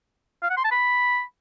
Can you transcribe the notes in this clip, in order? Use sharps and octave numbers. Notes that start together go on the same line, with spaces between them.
F5
F#5
C6
A5
B5